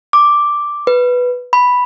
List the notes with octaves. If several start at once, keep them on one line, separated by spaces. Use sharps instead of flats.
D6
B4
B5